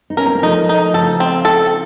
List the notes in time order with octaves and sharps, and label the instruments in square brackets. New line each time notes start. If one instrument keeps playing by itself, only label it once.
[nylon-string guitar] D#4
[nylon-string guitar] C#4 [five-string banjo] A#4
[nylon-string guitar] C4
A#3
[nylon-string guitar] F3 A3 [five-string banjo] D#4
[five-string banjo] D#4
[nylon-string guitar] C#3 F3 [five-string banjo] A4
[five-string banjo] C4
A4